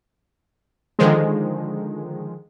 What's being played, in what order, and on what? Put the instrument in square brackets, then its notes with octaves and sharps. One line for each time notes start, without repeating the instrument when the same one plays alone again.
[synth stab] D3 D#3 F3 G#3